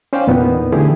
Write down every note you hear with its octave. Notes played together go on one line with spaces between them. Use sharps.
C#4 C5 D5 F5 G5
E2 A#2 B3 D#4
D3 E3 A3 E4 G4 G#4